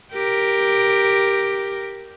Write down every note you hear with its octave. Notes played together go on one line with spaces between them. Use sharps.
G4 A#4